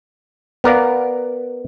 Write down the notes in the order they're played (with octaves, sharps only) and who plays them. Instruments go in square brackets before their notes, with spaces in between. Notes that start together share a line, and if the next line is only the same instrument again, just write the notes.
[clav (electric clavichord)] B3 A#4 D5 F5